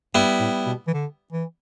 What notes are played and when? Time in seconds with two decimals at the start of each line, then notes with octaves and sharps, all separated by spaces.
0.15 G2 G3 B3 E4
0.40 A2
0.66 B2
0.87 E3
0.93 D3
1.32 E3